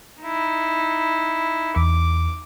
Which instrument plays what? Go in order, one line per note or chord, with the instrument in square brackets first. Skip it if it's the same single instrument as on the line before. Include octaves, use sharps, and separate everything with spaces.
[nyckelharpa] D#4 E4
[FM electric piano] E2 [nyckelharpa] D6